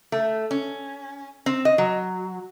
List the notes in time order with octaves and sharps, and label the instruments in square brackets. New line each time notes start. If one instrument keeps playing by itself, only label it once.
[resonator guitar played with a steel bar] A3
C#4
C4
D#5
F#3